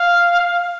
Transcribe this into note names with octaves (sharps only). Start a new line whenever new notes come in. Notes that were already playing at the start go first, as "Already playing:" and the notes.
Already playing: F5